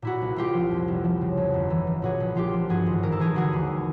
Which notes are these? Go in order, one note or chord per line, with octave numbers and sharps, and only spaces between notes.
A#2 E4 F#4
C2
C2 F4 G4
F3
F2
F1
F3
C#3
F2
G1
E3
C#3
A#2 F#4 G#4
A#1
A#1 F4 G4
F3
G2 F#4 G#4
G#1
G#1 A#4
A4
E3 G#4 A#4
D3 F#4 G#4
D#2